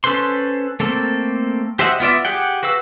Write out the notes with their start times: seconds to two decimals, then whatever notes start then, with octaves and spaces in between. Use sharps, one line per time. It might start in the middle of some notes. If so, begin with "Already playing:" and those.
0.04 C#4 A4 B4 C5 C6
0.80 A3 A#3 C4 A4
1.79 G4 C5 D#5 E5 F#5
2.00 B3 F4 D5 E5
2.25 G4 G#4 F#5 G5
2.63 F#4 B4 F5 E6